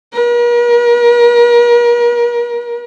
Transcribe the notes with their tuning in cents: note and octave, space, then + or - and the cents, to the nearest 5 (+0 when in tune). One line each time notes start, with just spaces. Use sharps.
A#4 +40